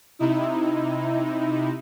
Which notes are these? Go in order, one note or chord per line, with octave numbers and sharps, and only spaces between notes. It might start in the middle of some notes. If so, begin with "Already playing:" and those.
C3 D#4 E4